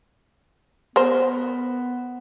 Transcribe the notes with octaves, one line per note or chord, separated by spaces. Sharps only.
B3 A#4 C5